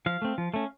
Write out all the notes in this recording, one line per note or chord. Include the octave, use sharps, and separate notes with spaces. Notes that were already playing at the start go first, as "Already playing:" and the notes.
F3 F5
A3 C4
F3
A3 C#4